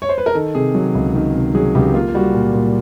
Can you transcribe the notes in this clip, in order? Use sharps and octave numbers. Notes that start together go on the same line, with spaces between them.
C#5
C5
B4
A#4
D#3 A4
C3 G#4
F#3
C#2
D#3
C3
F#3 G#4
C#2 G4
A#3 F4
F4
G3 F#4
A#2
A#2